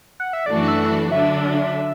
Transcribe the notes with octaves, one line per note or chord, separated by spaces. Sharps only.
F#5
E5
F#2 E3 A3 D4 F#4 D5
E5
D3 F#3 D4 E5